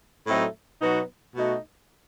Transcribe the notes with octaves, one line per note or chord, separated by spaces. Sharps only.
A2 F#3 A3 C4 D#4
B2 F#3 B3 D#4 F#4
B2 A3 D#4 F#4